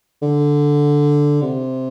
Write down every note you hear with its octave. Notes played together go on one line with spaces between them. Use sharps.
D3
C3